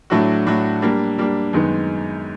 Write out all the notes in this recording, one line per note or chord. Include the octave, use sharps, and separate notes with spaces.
A2 F#3 A3 D4 F#4
A2 F#3 A3 D4 F#4
G3 A#3 D4
G3 A#3 D4
F#2 D#3 G#3 B3 D#4